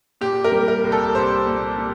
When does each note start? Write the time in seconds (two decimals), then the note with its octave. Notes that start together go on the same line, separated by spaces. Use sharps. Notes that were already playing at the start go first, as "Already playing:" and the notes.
0.21 A#2 G4
0.44 A#4
0.52 G3
0.68 A#4
0.84 C2
0.92 A4
1.15 C2 C5
1.47 A#2
1.78 G3